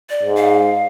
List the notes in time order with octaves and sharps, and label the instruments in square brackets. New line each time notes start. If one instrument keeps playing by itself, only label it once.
[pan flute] D5
[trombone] G#2
[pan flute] F5